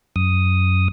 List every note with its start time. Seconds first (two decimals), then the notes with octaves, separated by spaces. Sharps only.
0.16 F#2 D#6